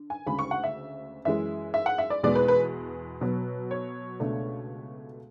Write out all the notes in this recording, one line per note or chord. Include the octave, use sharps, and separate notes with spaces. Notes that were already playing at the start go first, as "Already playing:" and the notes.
Already playing: D3
G#5
D2 C#3 G#3 B5
C#6
F#5
E5
F#2 E3 G#3 E5
E5
F#5
E5
D5
E2 B2 G#3 B3 D5
B4
B4
B2 F#3 B3
C#5
C#2 B2 A3 D4